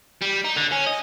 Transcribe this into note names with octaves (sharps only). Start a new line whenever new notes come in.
G3
D#4
D3
C#4
D#5